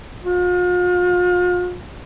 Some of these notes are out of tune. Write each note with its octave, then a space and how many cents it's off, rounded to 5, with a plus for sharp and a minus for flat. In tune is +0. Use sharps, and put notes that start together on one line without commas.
F4 +40